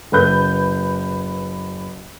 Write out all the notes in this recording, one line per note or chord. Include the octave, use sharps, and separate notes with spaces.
F#1 B4 G6